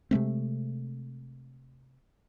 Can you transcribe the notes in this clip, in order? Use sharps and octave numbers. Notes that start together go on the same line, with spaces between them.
C3 G#3 A3 C4